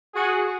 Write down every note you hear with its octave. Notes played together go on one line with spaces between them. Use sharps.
F#4 G#4